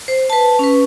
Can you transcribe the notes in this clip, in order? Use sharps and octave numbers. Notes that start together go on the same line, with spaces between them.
C5
B4 A5
C#4 B4